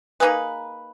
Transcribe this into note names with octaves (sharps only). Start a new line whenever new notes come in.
A#3 D#4 G#4 B4